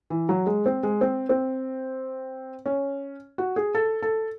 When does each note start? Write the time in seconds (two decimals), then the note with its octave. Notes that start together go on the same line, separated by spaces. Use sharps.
0.10 E3
0.29 F#3
0.47 G#3
0.66 C4
0.83 G#3
1.01 C4
1.29 C4
2.66 C#4
3.38 F#4
3.56 G#4
3.75 A4
4.02 A4